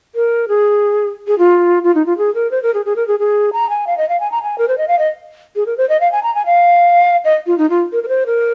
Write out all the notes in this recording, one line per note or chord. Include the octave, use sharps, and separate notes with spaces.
A#4
G#4
G#4
F4
F4
D#4
F4
G#4
A#4
C5
A#4
G#4
G#4
A#4
G#4
G#4
A#5
G#5
F5
D#5
F5
G#5
A#5
G#5
A#4
C5
D#5
F5
D#5
G#4
A#4
C5
D#5
F5
G#5
A#5
G#5
F5
D#5
F4
D#4
F4
A#4
A#4
C5
A#4